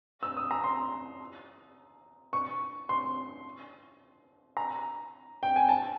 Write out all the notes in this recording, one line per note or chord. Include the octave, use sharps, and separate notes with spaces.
E6
D#6
A#5
C6
C#6
C6
A#5
G5
G#5
A5